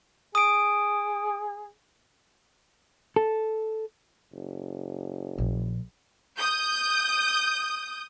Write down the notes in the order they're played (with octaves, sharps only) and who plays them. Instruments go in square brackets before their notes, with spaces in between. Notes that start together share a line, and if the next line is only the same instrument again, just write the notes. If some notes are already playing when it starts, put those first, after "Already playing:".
[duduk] G#4 [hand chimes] D#6 D7
[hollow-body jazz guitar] A4
[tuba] F#1
[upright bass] A#1
[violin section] D#6 G6